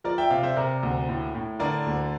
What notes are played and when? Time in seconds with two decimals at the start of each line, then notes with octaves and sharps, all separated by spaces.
0.04 F3 A#4 D5
0.18 E5 G5
0.30 C3 D5 F5
0.43 C5 E5
0.56 C3 A#4 D5
0.83 D2
1.09 A2
1.35 A2
1.59 D3 A#4 D5
1.86 D2